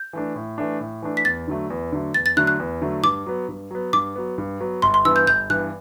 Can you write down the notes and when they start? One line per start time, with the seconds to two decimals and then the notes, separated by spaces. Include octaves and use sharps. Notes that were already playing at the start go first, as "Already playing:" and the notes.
Already playing: G6
0.13 E3 A3 D4
0.36 A2
0.58 E3 A3 D4
0.81 A2
1.02 E3 A3 D4
1.17 B6
1.25 E2 A6
1.48 D3 F#3 A3
1.70 E2
1.92 D3 F#3 A3
2.14 E2 A6
2.26 A6
2.37 D3 F#3 A3 F#6
2.47 F#6
2.59 E2
2.82 D3 F#3 A3
3.03 G2 D6
3.26 F#3 B3
3.48 G2
3.71 F#3 B3
3.93 G2 D6
4.16 F#3 B3
4.38 G2
4.60 F#3 B3
4.82 G1 C6
4.94 C6
5.05 G2 E3 B3 E6
5.16 G6
5.27 G1 G6
5.50 G2 E3 B3 F#6